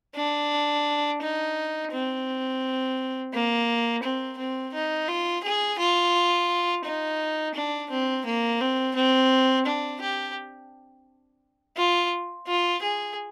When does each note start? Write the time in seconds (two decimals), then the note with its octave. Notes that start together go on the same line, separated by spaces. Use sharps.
0.16 D4
1.21 D#4
1.92 C4
3.33 A#3
4.03 C4
4.38 C4
4.73 D#4
5.08 F4
5.44 G#4
5.79 F4
6.85 D#4
7.54 D4
7.90 C4
8.26 A#3
8.61 C4
8.95 C4
9.66 D4
10.01 G4
11.77 F4
12.47 F4
12.83 G#4